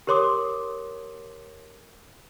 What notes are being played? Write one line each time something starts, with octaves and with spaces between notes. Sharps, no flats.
G4 A#4 C#5 C6 D6 D#6